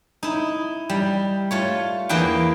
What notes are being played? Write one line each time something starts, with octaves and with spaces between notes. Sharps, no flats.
D#4 E4
G3
A3 F4 C#5
E2 A#3 E4 B4 G5